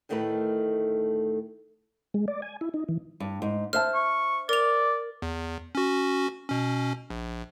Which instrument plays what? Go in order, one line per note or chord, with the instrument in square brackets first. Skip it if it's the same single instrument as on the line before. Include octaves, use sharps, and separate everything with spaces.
[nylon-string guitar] D2 A2 D#3 A3 A#4 B4
[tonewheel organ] G#3
D5
G#5
E4
D#4
E3
[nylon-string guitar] G2
G#2
[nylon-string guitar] C5 E5 A5 [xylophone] F6
[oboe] C#6
[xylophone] A#4 F7 [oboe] D5
[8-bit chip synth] E2
C#4 F#4
B2 C#4
A#1